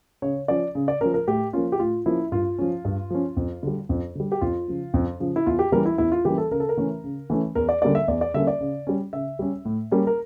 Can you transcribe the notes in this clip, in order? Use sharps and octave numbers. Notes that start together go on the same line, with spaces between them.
C#3 C#5
F3 C#4 D5
C#3
D5
F3 C#4 A#4
A#4
A2 G4
F3 A#3 C#4 F4
G4
A2 F4
F3 A#3 C#4 E4
G2 F4
F3 C#4
G2
F3 C#4
F2
D3 G3
F2
D3 G3
G4
F2 F4
C#3 F3
F2
C#3 F3
E4
E2 F4
G4
E3 G3 A#3 C#4 A#4
E4
E2 E4
F4
E3 G3 A#3 C#4 G4
A4
C#3 A#4
A4
A#4
E3 A3 C#4
C#3
E3 A3 C#4
E2 A#4
D5
D3 G3 A#3 C#4 D5
E5
E2 D5
D5
D3 G3 A#3 C#4 E5
D5
C#3
G3 C#4
C#3 E5
G3 C#4
A2
G3 A#3 C#4
A#4